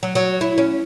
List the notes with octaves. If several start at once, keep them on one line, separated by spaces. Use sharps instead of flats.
F#3
F#3
E4
C#4